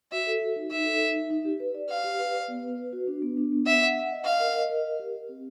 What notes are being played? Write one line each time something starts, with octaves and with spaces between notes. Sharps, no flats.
F#4 E5
A4
F#4
D#4
D#4 E5
A4
D#4
D#4
D#4
G4
B4
D5
B4 F5
G4
B4
D5
B3
B4
B4
F#4
D4
B3
D4
B3
E5 F#5
F#5
F#5
D#5
D#5 F5
A#4
D#5
A#4
A#4
G4
G4
C4